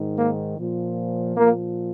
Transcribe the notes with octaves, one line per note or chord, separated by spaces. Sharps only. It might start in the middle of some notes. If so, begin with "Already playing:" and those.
Already playing: G#2 D#3
A#3
A#2 F3
A#2 F3 A#3